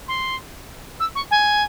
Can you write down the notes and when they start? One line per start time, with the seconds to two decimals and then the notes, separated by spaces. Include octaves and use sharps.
0.08 C6
1.00 E6
1.15 C#6
1.31 G#5